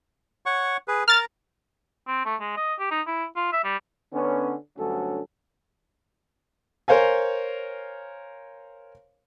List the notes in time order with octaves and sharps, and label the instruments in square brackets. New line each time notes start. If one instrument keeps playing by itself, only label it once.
[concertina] C#5 F#5 C#6
G#4 B4
[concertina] A#4 A#5 [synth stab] F6 A6
[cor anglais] C4
A3
G#3
D#5
G4
D#4
E4
F4
E5
G3
[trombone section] D3 B3 C#4
D2 G2 F#3 C#4 A4
[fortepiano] A#4 C5 C#5 F5 G#5